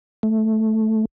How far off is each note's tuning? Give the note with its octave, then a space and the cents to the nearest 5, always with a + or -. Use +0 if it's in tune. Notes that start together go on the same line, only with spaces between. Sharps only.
A3 -5